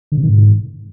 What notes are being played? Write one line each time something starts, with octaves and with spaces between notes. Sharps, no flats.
D3
C3
D#3
G#2